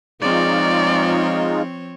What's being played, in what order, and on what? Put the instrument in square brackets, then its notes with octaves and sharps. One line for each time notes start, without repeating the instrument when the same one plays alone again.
[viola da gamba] F3 C4 C#5 [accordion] G#3 D#4 F4 [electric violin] D5